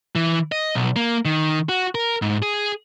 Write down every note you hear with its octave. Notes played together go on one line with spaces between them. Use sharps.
E3
D#5
B1
A#3
D#3
F#4
A#4
G#2
G#4